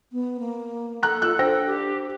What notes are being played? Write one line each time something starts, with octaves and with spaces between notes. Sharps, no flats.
B3
A#3
A4 A#5 F#6
F4 E6 F#6
D4 C5 G5 A#6
G4